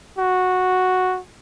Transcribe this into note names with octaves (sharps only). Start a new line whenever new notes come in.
F#4